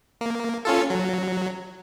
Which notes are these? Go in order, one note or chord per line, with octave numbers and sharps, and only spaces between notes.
A#3
C#4 F4 A4
F#3